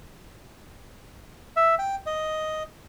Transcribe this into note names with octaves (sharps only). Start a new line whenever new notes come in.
E5
G5
D#5